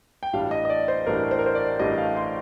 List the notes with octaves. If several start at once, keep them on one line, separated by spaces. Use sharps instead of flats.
G5
A1 A2 G3 D4 F5
D#5
D#5
D5
C5
A1 A2 G3 D4 A#4
C5
A#4
C5
D5
A1 A2 G3 D4 D#5
F5
C6